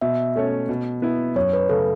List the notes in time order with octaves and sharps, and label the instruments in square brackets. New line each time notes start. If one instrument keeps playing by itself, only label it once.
[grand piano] B2 [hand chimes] E5
[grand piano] A3 C#4 A4 C#5
B2
B3 E4
[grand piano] F#2 [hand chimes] C#5
[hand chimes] B4
[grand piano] C#3 A3 [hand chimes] A4